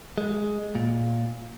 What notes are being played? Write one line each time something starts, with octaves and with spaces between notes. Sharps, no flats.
G#3
A#2